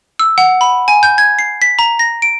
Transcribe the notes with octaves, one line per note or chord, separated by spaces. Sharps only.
E6
F#5
B5
G#5
G6
G#6
C7
B6
A#5
A#6
D7